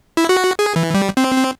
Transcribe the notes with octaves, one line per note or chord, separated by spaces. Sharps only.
E4
F#4
G#4
E3
G3
C4
C4